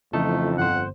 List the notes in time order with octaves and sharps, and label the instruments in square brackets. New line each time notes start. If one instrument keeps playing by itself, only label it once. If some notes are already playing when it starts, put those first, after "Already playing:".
[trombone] F2 [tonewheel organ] C#3 E3 F3 [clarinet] A3 [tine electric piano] D#4 A4 A5
[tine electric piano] G1 C5 [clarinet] F#5